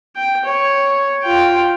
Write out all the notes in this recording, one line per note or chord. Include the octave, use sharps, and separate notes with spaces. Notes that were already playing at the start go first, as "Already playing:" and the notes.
G5
C#5
F4 G5